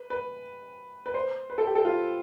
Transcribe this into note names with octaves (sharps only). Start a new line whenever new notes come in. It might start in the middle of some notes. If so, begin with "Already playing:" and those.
Already playing: B4
B4
B4
C5
B4
A4
G4
A4
F4